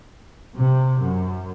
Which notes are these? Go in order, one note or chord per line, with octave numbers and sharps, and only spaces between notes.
C3
F#2